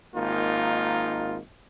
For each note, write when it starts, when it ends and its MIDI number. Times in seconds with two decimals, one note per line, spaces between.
0.15 1.38 32
0.15 1.38 58
0.15 1.38 63
0.15 1.38 65